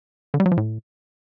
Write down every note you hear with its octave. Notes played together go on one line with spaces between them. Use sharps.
D3
G3
F#3
F3
A2